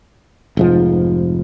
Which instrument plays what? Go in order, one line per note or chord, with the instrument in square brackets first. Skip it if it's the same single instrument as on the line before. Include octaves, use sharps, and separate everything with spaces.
[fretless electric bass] F1 G#2 F3